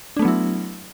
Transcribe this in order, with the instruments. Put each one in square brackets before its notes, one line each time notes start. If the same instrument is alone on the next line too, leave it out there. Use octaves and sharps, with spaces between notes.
[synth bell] D4
A3
B3
F#3
E4